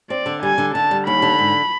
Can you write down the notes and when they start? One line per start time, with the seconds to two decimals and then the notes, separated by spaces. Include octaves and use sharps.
0.10 C4 D5
0.26 D3
0.43 G3 G#5
0.58 D3
0.74 D3 A5
0.91 G3
1.07 D#2 B5
1.22 D3
1.39 G#2